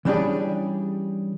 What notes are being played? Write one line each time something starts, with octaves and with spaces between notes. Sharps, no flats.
E3 G3 C#4 D4 G4 G#4